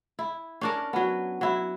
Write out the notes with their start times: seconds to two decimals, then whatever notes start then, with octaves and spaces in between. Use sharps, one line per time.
0.19 E4
0.61 C#4 D4 A#4
0.93 F#3 B3
1.41 F#3 E4